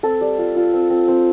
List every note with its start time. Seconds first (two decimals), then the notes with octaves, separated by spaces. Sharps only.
0.03 C4 A4
0.21 G3
0.38 F4
0.56 F4
0.73 C4
0.90 C4
1.08 C4